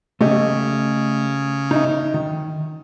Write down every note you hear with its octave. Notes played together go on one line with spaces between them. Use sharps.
C#3 A3 G4 D#5
D#4 D#5 E5
D#3